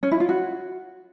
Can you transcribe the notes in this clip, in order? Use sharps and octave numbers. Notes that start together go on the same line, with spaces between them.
C#4
E4
F4
F#4